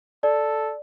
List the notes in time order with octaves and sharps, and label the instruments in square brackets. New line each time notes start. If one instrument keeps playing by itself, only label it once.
[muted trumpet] A4 [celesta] D5